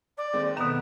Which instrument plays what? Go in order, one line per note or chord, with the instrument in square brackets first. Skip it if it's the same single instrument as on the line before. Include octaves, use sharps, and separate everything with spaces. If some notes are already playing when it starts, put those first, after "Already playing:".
[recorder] D5
[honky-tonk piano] D#2 G#3 C4
[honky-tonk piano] F1 A#5 E7 [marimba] B2 D#3 [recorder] B3